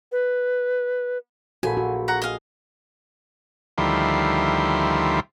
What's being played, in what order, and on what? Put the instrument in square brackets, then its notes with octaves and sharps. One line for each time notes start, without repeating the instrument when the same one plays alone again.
[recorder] B4
[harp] A#1 B5 [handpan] F#4 A4 [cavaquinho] G#5
[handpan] F#4
[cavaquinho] F#5 A#5 C#6
[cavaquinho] D#5 F5 [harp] G#5
[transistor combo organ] D2 D#3 F3 G3 E4 C6